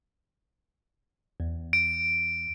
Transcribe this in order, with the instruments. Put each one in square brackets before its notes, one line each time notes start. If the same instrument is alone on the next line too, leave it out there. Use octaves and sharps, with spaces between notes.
[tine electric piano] E2
[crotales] D7